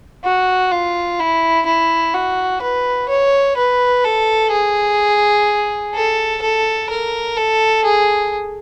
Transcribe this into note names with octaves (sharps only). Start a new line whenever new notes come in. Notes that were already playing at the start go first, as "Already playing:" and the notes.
F#4
F4
E4
E4
F#4
B4
C#5
B4
A4
G#4
A4
A4
A#4
A4
G#4